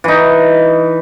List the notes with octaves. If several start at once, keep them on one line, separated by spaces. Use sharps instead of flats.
E3 D#4